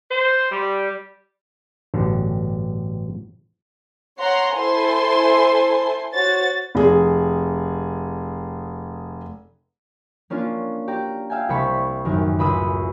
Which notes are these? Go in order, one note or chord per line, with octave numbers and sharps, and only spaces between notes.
C5
G3
A1 G2 B2 D3
C#5 F#5 A#5 C6
E4 A4 C5 G#5 C6
F#4 C5 C#5 A6
F1 G#4
A#3 C#4 D4 F4
G4 D5 A#5
E5 F5 G5 G#5
C2 G3 B5 C#6 B6
A1 F#2 D#3
C#2 B5 D#6 E6 B6